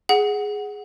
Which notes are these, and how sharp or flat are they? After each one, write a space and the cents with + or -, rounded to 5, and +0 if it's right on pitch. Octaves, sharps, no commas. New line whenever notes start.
G#4 +0 F#5 +0